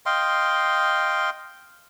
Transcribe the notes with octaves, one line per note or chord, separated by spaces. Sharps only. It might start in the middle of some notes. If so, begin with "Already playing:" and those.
D#5 F5 G5 C6